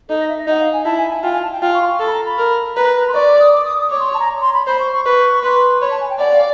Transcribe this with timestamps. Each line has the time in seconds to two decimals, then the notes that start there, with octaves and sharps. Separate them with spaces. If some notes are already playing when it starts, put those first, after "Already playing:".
0.09 D#4 A4
0.19 D#5
0.29 E5
0.38 D#5
0.47 D#4 F#5
0.60 F5
0.73 G#5
0.85 E4 A5
0.98 G#5
1.11 G#5
1.23 F4 G5
1.32 G#5
1.43 A5
1.52 G5
1.62 F4 G5
1.74 C#6
1.82 C6
1.87 C#6
2.00 A4
2.07 B5
2.13 A#5
2.25 B5
2.38 A#4
2.76 B4 A#5
3.08 C6
3.14 D5 C#6
3.27 D6
3.40 D#6
3.52 D6
3.65 D#6
3.78 D#6
3.90 C#5 D6
4.00 C6
4.14 A5
4.19 A#5
4.41 C6
4.54 B5
4.67 C5 B5
4.80 C#6
4.92 C#6
5.05 B4 C#6
5.43 B4 C6
5.81 C#5 B5
5.91 A5
6.01 G#5
6.10 G5
6.19 D5 F#5
6.32 F5